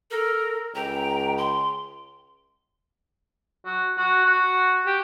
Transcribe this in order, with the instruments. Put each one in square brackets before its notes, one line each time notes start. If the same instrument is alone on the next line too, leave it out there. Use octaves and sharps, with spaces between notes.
[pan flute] A4 [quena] A#4
[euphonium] C#2 [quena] G5 [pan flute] A#5
[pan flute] C6
[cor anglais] F#4
F#4
F#4
G4